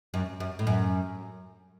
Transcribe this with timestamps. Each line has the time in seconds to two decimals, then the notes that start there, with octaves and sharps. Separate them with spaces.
0.14 F#2
0.40 F#2
0.59 A2
0.67 F#2